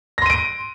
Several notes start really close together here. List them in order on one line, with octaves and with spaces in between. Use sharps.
A#6 C6 D#7 D7